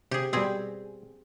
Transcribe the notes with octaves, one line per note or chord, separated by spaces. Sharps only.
C3 G4 G#4
B2 G3 C4 G4 G#4